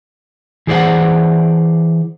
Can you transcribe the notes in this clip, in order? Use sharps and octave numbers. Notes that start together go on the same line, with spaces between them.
E3 G#4 C5 D5 F#5